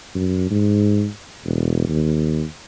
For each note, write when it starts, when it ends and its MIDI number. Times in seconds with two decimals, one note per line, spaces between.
0.15 0.46 42
0.51 1.07 44
1.44 1.86 28
1.88 2.45 39